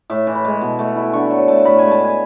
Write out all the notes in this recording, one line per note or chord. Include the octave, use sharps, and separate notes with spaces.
A2 E5
E3
B5
G#3
B2
A3
E4
D3 C#6
F#3
A3 A5
A2 B5
G#3 G#5
A5
B3 G#5